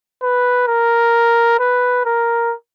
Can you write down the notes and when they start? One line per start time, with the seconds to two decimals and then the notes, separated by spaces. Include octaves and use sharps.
0.23 B4
0.68 A#4
1.60 B4
2.06 A#4